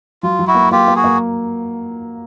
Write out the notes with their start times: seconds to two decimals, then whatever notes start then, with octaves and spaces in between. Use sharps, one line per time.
0.23 F#3 F4
0.39 F#3
0.47 E4 F#4
0.55 A#3
0.71 A#3 F4 G4
0.88 A#3
0.95 F#4 G#4
1.04 A#3